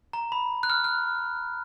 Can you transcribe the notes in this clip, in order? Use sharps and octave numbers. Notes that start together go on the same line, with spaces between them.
A#5
B5
F#6
F6
F#6